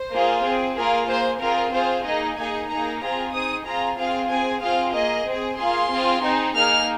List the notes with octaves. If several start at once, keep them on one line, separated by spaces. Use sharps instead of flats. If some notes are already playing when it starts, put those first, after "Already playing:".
Already playing: C5
A#3 F4 G#4
C4 G#4
A#3 F4 G#4 A#4
A#3 G#4 C5
C4 F4 G#4 A#4
C4 F4 G#4 C5
A#3 D#4 G#4 D#5
A#3 D#4 G#4 G#5
A#3 D#4 G#4 A#5
C4 F4 G#4 A#5
C4 D#4 G#4 D#6
C4 F4 G#4 A#5
C4 F4 G#4 F5
C4 G#4 G#5
C4 F4 G#4 F5
A#3 G#4 D#5
C4 G#4
A#3 F4 G#4 C6
C4 F4 G#4
C4 D#4 G#4
A#3 D#4 G#4 F6